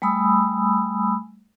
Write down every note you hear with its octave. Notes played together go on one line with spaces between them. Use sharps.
G3 A3 G#5 B5 D#6 E6